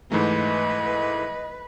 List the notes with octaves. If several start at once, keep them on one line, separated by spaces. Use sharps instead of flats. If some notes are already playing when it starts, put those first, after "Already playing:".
G#2 E3 A3 B4 D#5